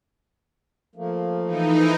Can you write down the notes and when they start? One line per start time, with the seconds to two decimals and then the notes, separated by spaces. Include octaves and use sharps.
0.95 F3 A3 A#3
1.46 E3 D#4